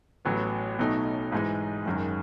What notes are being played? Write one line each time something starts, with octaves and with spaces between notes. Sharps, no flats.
A1 A2 F#3 B3
B1 B2 A3 D#4
G#2 E3 G#3 D#4
F#1 F#2 D#3 G#3